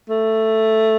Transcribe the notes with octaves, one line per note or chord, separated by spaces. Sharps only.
A3